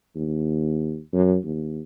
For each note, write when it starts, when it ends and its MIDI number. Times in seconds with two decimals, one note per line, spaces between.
0.16 0.98 39
1.13 1.37 42
1.45 1.81 39